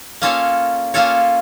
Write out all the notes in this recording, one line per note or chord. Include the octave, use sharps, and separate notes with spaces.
A#3 C#4 F4 A4 C#5
A#3 C#4 F4 A4 C#5